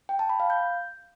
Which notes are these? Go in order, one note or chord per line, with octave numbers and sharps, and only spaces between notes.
G5
A5
B5
F5
G6